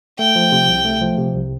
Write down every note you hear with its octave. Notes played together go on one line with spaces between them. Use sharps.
A3 G5
F3
C3
C2
A3
F3
C3
C2